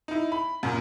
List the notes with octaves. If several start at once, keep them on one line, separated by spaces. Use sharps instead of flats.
D#4 E4
B5
F#2 A#2